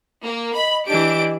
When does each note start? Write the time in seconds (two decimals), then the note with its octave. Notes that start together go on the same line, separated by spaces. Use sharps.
0.24 A#3
0.55 D#5 B5
0.88 E3 D4 G4 D#5 D7